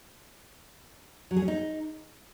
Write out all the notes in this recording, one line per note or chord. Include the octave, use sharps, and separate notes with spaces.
F#3
G#4
C#4
D#4